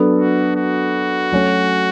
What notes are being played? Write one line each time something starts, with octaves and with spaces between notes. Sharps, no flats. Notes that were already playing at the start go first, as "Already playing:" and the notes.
Already playing: F#3 B3 D4 A4
F#4
F#4
F#3 A3 C#4